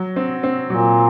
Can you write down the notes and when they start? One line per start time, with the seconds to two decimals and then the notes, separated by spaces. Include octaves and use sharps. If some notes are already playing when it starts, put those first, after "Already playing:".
Already playing: F#3
0.16 C4
0.43 C4
0.70 A#2 F#3